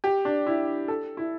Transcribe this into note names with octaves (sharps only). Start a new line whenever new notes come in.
G4
D4
E4
A4
E4